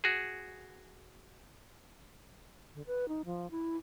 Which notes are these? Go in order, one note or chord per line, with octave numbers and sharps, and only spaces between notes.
F#4 G#4
D3
B4
D#4
F3
E4